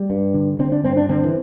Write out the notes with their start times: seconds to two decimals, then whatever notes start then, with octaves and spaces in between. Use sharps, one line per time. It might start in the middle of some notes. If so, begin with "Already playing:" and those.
Already playing: G3
0.10 G2
0.34 D3
0.59 D3 C4
0.72 D4
0.84 G2 C4
0.97 D4
1.09 D3 C4
1.24 E3